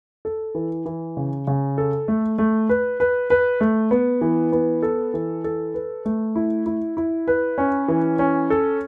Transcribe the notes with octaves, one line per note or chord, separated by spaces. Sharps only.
A4
E3
E3
C#3
C#3
A4
A3
A3
B4
B4
B4
A3
B3
E3
B3
A4
E3
A4
B4
A3
E4
E4
E4
B4
C#4
E3
C#4
A4